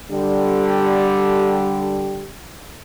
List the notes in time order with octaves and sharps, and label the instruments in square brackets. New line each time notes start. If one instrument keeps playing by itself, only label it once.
[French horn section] D3 G3 G4